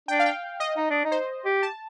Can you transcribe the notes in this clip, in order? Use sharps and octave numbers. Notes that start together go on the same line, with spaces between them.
D4 G5
F5
G5
D#5
D#4
D4
D#4
C5
G4
A5